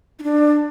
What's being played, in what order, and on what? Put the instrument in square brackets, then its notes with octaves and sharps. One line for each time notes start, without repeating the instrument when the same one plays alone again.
[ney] D#4
D4